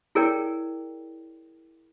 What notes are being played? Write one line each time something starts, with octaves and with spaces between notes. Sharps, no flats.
E4 G#4 A#4 C#5 D5 G5